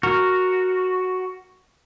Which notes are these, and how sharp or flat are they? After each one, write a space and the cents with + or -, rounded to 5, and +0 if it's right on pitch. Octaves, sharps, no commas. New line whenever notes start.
F#4 +0 A#4 +0